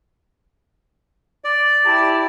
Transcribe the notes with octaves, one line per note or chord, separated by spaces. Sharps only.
D5
E4 G4 A5